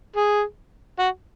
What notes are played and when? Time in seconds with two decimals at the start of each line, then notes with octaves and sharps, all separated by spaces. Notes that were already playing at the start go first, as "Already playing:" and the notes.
0.17 G#4
0.99 F#4